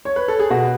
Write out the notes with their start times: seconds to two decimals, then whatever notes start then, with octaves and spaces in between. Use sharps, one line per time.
0.05 C#5
0.16 B4
0.28 A4
0.39 G#4
0.50 B2 F#4